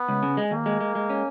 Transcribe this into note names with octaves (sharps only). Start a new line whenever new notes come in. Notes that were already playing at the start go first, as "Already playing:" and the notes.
Already playing: B3
C#2
C#3
G#3
D#2 A#3
G#3
G#3
G#3
C#4